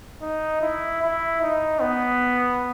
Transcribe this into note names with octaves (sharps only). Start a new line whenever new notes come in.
D#4
E4
E4
D#4
B3